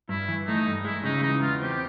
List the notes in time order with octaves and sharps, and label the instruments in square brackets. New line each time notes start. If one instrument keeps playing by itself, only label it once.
[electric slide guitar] G2 [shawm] E4
[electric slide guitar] E3
[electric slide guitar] A3 [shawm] D#4
[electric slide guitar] G2
[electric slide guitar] G#3 [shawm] E4
[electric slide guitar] C#3 [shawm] D#4
[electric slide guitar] E3 [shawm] D#4
[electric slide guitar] E2 [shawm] F4
[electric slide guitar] C4 [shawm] G4